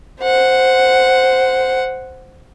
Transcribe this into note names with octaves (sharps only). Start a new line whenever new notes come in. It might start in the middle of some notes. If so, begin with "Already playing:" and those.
C5 F#5